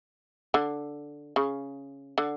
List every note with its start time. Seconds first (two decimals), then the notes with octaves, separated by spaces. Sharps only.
0.54 D3
1.36 C#3
2.18 D3